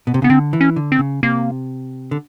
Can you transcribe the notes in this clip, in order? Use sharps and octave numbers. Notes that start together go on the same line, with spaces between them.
B2
C3
C#3 B3
D3 C4
E3
C#4
D3
C4
C#3
C3 A#3
D3